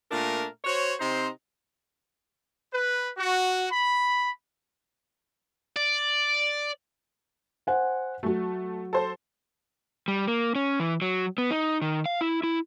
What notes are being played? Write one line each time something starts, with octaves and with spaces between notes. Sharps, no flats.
A#2 A3 D4 A#4
F#4 C5 C#5
C3 C4 D#4 C5
B4
F#4
B5
D5
C5 F#5 G#5
F#3 A3 F#4
A4 C5
G3
A#3
C#4
E3
F#3
B3
D#4
D#3
F5
E4
E4